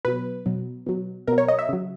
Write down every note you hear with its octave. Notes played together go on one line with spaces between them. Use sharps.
B2 F#3 B4
B2 F#3
B2 F#3
B2 F#3 A#4
C#5
D#5
E5
C#3 F#3